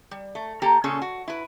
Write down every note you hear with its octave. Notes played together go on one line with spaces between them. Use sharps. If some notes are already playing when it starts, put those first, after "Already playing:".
G3
A3
A#3 G4 A4 A#5
A#2 C#3 C#4 G#4 A4
F#4
E4 B4